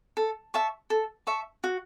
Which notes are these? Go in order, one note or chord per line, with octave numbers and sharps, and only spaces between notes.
A4
E5 A5 C#6
A4
E5 A5 C#6
F#4